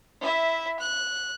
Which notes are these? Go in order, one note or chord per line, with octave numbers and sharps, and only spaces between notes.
E4 E5
F#6